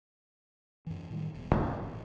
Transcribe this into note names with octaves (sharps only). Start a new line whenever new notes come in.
F#2 E3
A2 D#3 G3
E1
F2 A#2 D3
A1